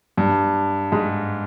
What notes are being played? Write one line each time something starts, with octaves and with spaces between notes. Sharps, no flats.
G2
G#2